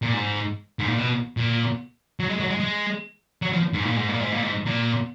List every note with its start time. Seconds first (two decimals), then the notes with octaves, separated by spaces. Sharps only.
0.02 A#2
0.13 G#2
0.79 G#2
0.88 A#2
0.96 B2
1.37 A#2
2.20 F#3
2.29 G#3
2.40 F#3
2.50 G#3
2.60 G#3
3.42 F#3
3.53 F3
3.73 G#2
3.85 A#2
3.97 G#2
4.09 A#2
4.20 G#2
4.32 A#2
4.43 G#2
4.66 A#2